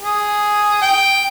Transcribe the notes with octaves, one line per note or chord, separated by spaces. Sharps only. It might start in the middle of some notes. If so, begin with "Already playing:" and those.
G#4
G5